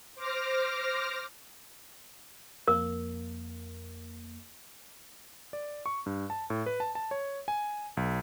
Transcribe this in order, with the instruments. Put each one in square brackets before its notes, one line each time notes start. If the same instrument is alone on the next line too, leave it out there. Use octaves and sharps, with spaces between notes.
[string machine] C5 D6 F6 A#6
[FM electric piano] F2 A#3 [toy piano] A#4
[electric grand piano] D5
C#6
G2
A5
A2
B4
A5
A5
C#5
G#5
B1